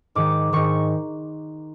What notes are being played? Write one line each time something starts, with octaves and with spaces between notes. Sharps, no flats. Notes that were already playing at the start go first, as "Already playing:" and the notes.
G#2 D#3 D6
G#2 D#3 C#6